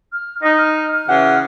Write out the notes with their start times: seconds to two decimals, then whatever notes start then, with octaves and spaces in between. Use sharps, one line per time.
0.13 F6
0.42 D#4 A#6
0.58 F6
0.93 F6
1.08 C#3 E3 F#5